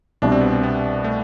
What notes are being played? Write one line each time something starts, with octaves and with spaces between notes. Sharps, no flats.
C2 B2 G3 D4
C4
B3
C4
B3
A3